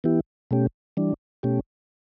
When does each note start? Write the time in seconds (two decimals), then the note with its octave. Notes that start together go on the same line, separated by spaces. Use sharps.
0.04 E3 B3 E4 G4
0.51 B2 A3 C#4 G4
0.97 E3 G3 D4
1.43 B2 A3 C#4 G4